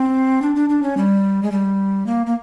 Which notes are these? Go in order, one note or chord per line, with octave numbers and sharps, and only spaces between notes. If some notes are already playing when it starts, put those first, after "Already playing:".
Already playing: C4
D4
D4
D4
C#4
G3
G#3
G3
A#3
A#3